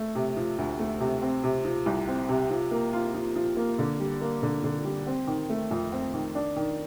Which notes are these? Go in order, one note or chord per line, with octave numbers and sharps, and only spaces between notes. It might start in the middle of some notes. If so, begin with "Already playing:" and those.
Already playing: A3
C3
F3
D2
A3
C3
C4
C3
F3
C2
C4
C3
F3
A#3
F4
F3
F3
A#3
D3
G3
A#3
D3
D3
G3
C4
D#3
A3
F2
C4
D#3
D4
D#3